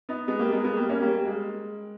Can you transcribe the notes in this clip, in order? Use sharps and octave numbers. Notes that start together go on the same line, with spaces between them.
B3 D#4
G#3 B3
G3 A#3
G#3 B3
G#3 B3
G3 A#3
A#3 C#4
G3 A#3
G3
G#3